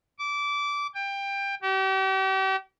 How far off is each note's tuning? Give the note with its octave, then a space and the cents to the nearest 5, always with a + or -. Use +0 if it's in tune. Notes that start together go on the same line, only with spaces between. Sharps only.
D6 -20
G5 +20
G4 -40